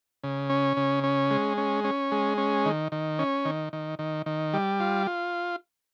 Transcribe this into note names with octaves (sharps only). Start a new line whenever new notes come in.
C#3
C#4
C#3
C#4
G#3
C#4
C#4
G#3
C#4
D#3
D#3
C#4
D#3
D#3
D#3
D#3
G3
F4
F4